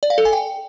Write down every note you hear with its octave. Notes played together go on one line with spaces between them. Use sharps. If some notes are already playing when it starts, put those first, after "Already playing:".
D5
F5
A4
G#5
G5